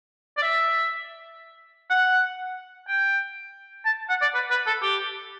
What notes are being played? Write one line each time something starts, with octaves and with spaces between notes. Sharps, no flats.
D5
E5
F#5
G5
A5
F#5
D5
B4
B4
A4
G4